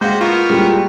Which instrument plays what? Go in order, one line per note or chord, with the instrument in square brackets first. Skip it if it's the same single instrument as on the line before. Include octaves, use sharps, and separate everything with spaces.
[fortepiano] G#3 [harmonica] F#4 G4 C5 [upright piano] F5 G6
[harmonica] B3 A#4 C#6 [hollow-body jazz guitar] F4
[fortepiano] A#2 [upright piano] G3 G#3